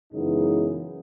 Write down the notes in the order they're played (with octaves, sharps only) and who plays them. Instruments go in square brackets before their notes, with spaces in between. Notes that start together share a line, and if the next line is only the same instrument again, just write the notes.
[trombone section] F#2 C#3 E3 G#3 B3 D#4